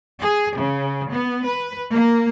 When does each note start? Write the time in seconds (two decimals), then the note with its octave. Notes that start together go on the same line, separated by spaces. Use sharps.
0.21 G#4
0.57 C#3
1.11 B3
1.45 B4
1.92 A#3